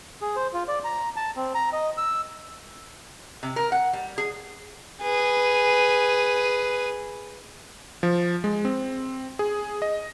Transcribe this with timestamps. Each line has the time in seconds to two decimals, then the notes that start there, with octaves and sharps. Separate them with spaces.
0.21 G#4
0.36 C5
0.53 F4
0.68 D5
0.84 A#5
1.16 A5
1.36 C4
1.55 A#5
1.73 D#5
1.97 E6
3.43 C3
3.56 A#4
3.72 F#5
3.93 G3
4.18 G#4
5.02 G#4 B4
8.03 F3
8.44 G#3
8.65 C4
9.39 G#4
9.82 D#5